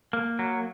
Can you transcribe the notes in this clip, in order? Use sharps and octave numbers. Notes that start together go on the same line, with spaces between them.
A#3
F#3